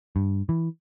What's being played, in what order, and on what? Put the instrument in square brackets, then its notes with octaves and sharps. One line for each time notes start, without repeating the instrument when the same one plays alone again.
[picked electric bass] G2
E3